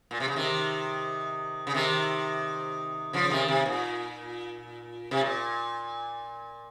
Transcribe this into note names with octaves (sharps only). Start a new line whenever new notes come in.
A#2
C3
C#3
C3 D#3
C#3
C3 D#3
C#3 F3
C3 D#3
C3
A#2
C3
A#2